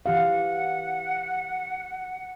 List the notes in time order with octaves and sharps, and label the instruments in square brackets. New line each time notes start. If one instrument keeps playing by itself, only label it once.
[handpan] E3 G4 F5 [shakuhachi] F#5